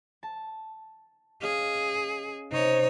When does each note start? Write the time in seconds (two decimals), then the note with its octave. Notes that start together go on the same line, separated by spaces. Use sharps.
0.23 A5
1.42 C#4 G#4 D#5 F5
2.51 C3 D#4 C#5